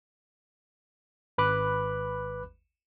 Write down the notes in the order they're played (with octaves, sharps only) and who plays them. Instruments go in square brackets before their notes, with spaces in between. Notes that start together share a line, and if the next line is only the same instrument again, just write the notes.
[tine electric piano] G#1 B4 B5 D6 F#6